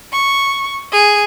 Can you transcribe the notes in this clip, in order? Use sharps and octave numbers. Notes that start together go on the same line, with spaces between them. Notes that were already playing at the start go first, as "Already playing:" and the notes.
C#6
G#4